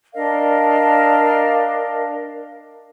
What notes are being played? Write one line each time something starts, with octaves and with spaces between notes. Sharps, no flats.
D4 A#4 D#5 F5